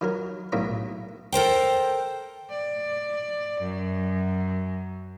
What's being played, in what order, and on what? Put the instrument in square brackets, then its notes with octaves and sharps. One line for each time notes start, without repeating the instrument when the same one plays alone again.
[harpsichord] D#3 F#3 A#4
B1 A2 C#3 E5 A#5
[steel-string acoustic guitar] A4 A#4 C5 G5
[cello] D5
F#2